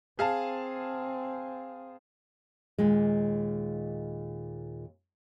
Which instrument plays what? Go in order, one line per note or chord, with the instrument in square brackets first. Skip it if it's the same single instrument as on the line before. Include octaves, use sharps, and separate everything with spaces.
[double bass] C4 [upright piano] G#4 F5 A5
[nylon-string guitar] D#2 A#2 G#3